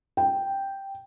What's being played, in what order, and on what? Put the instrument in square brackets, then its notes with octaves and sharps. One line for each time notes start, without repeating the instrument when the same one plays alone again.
[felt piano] G5